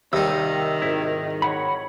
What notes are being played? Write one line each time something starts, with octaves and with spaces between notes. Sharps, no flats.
D#2 C3 D#3 G3 D#4 E6
G#1 E4
C#5 F#5 B5